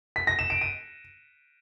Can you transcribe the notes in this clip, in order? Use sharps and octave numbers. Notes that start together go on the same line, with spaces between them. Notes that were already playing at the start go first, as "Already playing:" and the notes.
B6
A#6
E7
D7
D#7